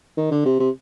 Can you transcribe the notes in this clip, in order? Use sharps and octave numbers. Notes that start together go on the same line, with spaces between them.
D#3
D3
C3
C3